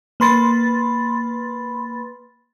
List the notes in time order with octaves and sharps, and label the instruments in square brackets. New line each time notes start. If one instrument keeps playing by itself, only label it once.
[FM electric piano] A#3 B4 B5 C6 A6